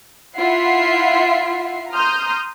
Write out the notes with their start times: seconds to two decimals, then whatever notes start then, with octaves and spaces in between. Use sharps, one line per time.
0.38 E4 F4 E5 F#5 C7
1.92 A#5 C6 D#6 F6 G6